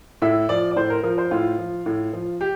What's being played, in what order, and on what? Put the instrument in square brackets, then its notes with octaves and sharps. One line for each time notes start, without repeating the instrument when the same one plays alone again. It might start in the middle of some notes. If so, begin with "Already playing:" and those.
[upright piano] A2 E5
F3 D5
D5
A2 C5
A#4
F3 A#4
C5
A2 F4
F3
A2
F3
G4